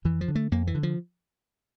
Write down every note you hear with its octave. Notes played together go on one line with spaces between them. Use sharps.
F2 E3
F3
D3
A3
F2 A#3
E3
D3
F3